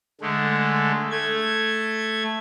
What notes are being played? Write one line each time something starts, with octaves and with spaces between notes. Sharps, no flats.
D3 G#3 A3
A3 G#6